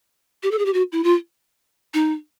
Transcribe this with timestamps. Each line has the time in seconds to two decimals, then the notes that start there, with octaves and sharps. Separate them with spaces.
0.43 G4
0.51 A4
0.59 G#4
0.65 G4
0.73 F#4
0.92 E4
1.04 F4
1.94 D#4